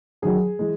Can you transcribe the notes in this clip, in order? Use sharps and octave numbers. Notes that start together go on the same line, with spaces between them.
F#2 D#3 F#3 G#4
E3 G#3